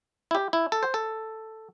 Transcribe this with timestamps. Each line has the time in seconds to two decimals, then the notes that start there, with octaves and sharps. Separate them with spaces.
0.31 E4
0.35 G4
0.53 E4
0.72 A4
0.83 C5
0.94 A4